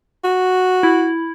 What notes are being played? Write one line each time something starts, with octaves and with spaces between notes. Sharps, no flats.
F#4
E4